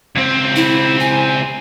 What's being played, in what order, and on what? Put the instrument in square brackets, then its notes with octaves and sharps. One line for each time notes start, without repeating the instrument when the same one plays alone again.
[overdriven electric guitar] C#2 C4
[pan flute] E4
G#5